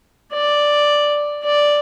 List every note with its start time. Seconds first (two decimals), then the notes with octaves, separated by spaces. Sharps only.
0.33 D5
1.44 D5